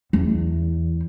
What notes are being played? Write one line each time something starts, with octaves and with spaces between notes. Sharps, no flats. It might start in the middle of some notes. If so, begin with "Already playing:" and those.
E2